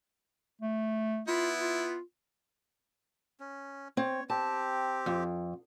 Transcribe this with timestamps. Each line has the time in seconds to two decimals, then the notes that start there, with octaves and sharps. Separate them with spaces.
0.61 A3
1.28 B3 E4 F4
1.61 F4
3.40 C#4
3.97 C4 C#5
4.30 C4 G4 A5
5.06 F2